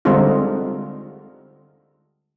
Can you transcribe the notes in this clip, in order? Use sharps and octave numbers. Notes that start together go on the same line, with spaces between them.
D3 G3 G#3 C4 D#4 F4